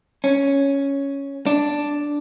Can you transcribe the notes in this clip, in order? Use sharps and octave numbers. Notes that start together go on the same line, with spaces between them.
C#4
D4